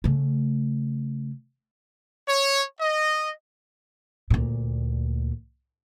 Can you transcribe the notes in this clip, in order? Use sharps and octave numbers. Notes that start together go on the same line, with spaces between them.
C#3 A3
C#5
D#5
D2 A#2